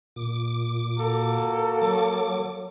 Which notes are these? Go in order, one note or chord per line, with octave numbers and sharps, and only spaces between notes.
A#2 D6
A#3 F#4 A4
F#3 D6